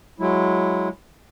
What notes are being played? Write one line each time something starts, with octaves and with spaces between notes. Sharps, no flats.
F#3 G#3 E4